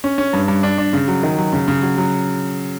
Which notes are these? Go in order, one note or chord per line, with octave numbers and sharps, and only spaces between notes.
C#4
C#4
G2
G2
D4
D4
C#3
F#3
D#3
F#3
C#3
C#3
F#3
F#3